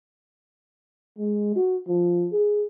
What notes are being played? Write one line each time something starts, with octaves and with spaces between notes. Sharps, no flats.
G#3
F#4
F3
G#4